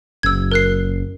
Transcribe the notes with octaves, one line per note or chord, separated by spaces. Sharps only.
F#1 E6 G#6
A#4 F#6 C7